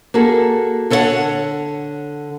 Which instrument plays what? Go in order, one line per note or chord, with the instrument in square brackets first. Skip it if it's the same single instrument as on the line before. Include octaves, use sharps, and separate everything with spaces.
[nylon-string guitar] A#3 F#4 G#4 A4
D3 A4 C#5 D5 F#5